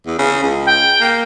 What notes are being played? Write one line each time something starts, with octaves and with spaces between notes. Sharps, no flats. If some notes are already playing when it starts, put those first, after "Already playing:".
E2
C#3
C#2
G5
A#3